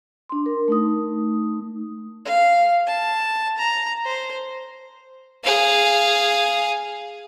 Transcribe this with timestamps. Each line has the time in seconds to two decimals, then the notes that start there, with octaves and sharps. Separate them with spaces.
0.29 D4 C6
0.46 A#4
0.68 A3 D#4 D#6
2.25 F5
2.87 A5
3.58 A#5
4.05 C5
5.44 G#4 F5